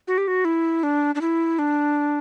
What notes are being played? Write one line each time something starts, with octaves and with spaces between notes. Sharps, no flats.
F#4
G4
F#4
E4
D4
D4
E4
D4